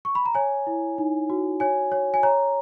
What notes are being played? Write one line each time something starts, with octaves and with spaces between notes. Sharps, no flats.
C#6
B5
A#5
C#5 G#5
E4
D#4
F#4
C#5 G#5
C#5
G#5
C#5 A#5